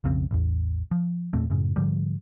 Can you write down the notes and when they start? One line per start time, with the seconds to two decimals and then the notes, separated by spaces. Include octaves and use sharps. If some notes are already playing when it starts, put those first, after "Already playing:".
0.04 B1 F2 C#3 C4
0.31 A1 E2
0.91 F3
1.33 E2 A#2 A3 C4
1.50 F#2 A2 C#3
1.76 G#2 D3 F3 G3